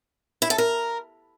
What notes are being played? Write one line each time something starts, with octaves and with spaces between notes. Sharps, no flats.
E4
A4
A#4